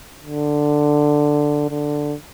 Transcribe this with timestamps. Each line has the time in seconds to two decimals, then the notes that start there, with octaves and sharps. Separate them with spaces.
0.23 D3
1.70 D3